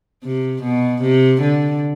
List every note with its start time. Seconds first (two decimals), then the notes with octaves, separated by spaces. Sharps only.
0.24 C3
0.63 B2
1.02 C3
1.42 D3